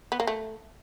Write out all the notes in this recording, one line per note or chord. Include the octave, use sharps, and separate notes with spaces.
B3
A#3
A3